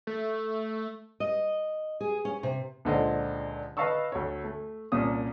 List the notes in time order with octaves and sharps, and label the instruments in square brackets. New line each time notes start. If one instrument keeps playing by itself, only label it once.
[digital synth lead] A3
[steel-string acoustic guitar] D#5
G#4
C#4
C3
[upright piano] C#2 A#2 D3 C5 D#5
B4 D#5 F5 A5 C#6 E6
D2 C#5
A3
C2 A#2 A#3 C#4 D#6